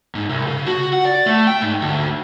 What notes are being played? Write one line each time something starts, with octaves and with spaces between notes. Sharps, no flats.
G#2
C2
C#3
F#4
F#5
D5
A3
G5
G#2
D2